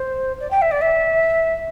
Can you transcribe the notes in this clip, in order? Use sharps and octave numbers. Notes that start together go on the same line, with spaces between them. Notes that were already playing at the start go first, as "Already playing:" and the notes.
Already playing: C5
D5
G5
E5
D5
E5